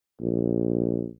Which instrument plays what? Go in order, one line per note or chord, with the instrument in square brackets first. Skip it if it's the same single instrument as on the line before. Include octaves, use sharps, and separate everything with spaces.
[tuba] A#1